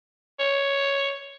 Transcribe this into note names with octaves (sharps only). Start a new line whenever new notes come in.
C#5